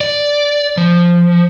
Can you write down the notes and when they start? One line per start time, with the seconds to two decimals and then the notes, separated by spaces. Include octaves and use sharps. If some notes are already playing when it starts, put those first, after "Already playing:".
0.01 D5
0.77 F3